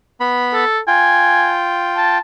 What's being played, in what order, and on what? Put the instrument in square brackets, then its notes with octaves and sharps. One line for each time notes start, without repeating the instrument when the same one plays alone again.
[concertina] B3 B5
[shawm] A4
[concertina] F4 G5 [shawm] G#5
[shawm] A5